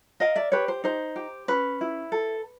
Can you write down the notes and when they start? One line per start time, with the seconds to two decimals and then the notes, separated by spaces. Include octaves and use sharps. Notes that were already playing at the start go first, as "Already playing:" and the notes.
0.20 A#4 D#5 F5
0.36 D5 E5
0.52 G4 B4 C#5
0.68 C5
0.84 D#4 C5
1.16 G4
1.48 C#4 B4
1.81 E4
2.12 A4